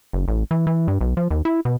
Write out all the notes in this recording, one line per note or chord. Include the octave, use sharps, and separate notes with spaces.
F#1
A1
E3
E3
G2
B1
F3
D#2
E4
B2